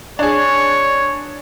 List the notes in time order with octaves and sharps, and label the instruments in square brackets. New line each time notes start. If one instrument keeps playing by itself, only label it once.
[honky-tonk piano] D4 G#4 [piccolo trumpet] C#5